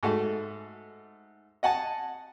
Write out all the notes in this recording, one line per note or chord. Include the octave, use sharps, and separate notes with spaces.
G#2 A3 F#4
D#5 F#5 G#5 A5